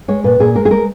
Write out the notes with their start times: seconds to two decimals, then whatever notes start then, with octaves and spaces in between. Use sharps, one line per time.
0.08 G#3 C#5
0.24 A#2 B4
0.40 A#2 G#4
0.55 G#3 A#4
0.65 G#4
0.71 G#3 A#4